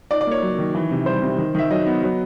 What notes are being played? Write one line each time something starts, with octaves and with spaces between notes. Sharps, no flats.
D#4 D5
D5
A#3 C#5
F#3
D#3
E3
C3
G3 C5
C3
D#3
D#3 E5
F#3 D#5
B3
F#3